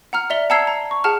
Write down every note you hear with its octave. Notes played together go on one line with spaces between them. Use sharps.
F#5 A#5 F6
D5 E5 F7 G7
F#5 A5 A#5 E6 G#6 C7
A#5
C#6
G#4 F#5 A5 F6